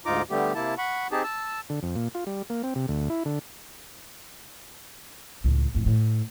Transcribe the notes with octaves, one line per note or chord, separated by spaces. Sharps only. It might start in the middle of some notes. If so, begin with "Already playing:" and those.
D2 G#2 D#4 F4 A#5 D6
D3 G3 A3 B3 G4
C3 A#3 E4 A5
F#5 B5 C#6
C4 D#4 G4 G#4 A5
A5 E6
D3
F2
A#2
F4
G3
A#3
C4
C3
D2
E4
D3
C#2 A2
F2 A2
A2